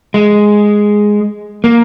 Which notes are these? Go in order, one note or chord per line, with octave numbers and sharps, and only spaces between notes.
G#3
A#3